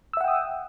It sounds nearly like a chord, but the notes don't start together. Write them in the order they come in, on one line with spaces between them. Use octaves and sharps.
E6 E5 F#5 G5 D#6